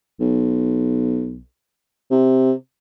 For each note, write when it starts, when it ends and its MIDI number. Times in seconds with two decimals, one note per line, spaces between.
0.20 1.41 35
2.11 2.52 48